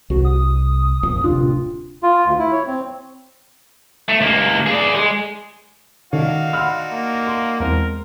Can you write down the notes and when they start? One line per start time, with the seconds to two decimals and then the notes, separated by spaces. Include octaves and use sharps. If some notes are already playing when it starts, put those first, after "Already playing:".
0.10 C2 F#4
0.25 D#6
1.03 A#1 F2
1.24 D1 C3 D4 F4
2.03 F4
2.25 D2
2.39 E4
2.52 C#5
2.67 C4
4.09 A3
4.21 C#2 A#3
4.67 G#4 D5
4.95 G#3 G#4
6.13 D#3 D4 D#4 F#4 C#5 F5
6.53 F#5 B5 C6 E6 F6
6.92 A#3
7.27 C6
7.60 E2 G#3 C4 A#4